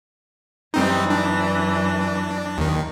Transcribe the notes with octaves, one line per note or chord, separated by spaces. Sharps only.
F#2 E3 G3 C4 D#4
D4
D#2 D#3